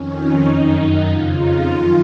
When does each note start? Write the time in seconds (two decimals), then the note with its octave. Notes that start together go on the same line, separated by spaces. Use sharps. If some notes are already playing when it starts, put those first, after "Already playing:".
Already playing: F2 D#3 C#4
0.18 D#4
0.47 F#2 D#3
1.06 F2 C#3 F4
1.37 D#4
1.66 F#2 D#3 F4